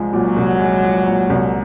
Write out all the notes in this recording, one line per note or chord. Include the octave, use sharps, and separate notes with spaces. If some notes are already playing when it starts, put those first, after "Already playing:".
Already playing: C2 F3 G#3
A#2 F#3
C2
G#3
F3
A#2
C2